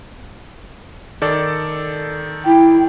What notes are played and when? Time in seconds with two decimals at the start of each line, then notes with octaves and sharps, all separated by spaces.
1.22 D#3 A4 D5
2.45 E4 G5